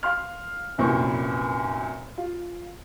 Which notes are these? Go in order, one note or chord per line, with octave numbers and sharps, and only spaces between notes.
F5 C6 F6
F1 F#2 A#2 C4 E4 C#6
F4